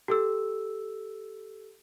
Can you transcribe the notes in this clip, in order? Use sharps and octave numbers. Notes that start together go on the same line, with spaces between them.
G4 A4 E6